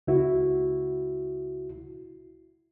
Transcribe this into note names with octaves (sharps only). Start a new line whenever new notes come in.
C#2 E4 F#4